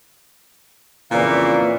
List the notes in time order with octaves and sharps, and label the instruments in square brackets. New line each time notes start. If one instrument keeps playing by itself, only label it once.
[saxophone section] F2 A#2 C#3 E3 D5 F5